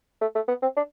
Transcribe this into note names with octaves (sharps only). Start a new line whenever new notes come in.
A3
A3
B3
C4
D4